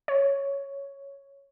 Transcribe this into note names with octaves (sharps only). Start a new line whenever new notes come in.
C#5